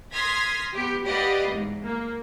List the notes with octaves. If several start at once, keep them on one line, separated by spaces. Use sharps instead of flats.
C6 D#6 F6 G#6 A#6 B6
B3 G4
G4 B4 D5 D#5 F5 F#5
E2 G#2
A#3